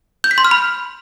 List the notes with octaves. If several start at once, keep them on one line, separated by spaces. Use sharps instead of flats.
G6
B6
C6
F6
B5